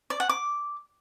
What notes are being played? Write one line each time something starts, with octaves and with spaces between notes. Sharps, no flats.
D5
F#5
D6